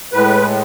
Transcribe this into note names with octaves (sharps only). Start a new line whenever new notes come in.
A2 G#3 B4